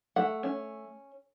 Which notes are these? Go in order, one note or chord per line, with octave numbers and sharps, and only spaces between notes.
A3 F#5
C#4